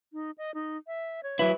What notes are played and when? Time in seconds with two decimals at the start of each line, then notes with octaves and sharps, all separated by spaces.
0.13 D#4
0.38 D#5
0.54 D#4
0.87 E5
1.23 C#5
1.39 E3 F#3 E4